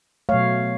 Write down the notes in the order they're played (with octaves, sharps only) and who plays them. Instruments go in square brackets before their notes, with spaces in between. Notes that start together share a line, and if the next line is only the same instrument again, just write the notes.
[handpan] B2 F#3 A3 C#5 F5